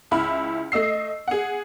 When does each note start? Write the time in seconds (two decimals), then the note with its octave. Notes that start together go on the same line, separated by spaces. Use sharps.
0.11 C#2 E4 B5 F6
0.72 A3 D#5 E6 C7
1.28 G#4 F#5